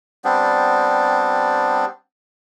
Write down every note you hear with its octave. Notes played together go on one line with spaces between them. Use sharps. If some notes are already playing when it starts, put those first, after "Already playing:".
G3 B3 C4 D4